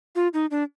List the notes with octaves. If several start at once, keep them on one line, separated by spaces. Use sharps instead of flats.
F4
D#4
D4